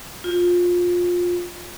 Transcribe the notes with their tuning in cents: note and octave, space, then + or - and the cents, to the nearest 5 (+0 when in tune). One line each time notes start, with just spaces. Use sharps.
F4 +20